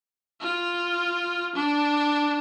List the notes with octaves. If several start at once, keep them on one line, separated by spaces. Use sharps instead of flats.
F4
D4